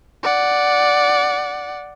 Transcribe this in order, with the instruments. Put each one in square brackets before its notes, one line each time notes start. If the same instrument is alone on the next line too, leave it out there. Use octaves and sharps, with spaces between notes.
[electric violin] D5 F#5